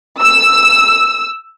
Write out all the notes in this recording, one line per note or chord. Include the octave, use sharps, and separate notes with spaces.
E6